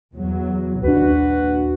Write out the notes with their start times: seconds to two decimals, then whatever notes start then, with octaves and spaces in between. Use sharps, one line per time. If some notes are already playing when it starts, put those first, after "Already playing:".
0.13 E2 F#3
0.84 A#1 D#2 D4 F#4 B4